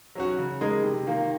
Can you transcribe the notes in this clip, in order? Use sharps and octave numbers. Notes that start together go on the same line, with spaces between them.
F#3 C#4 F#4
C#3
G#3 D#4 A#4 D#5
C3
D#3 A#3 F4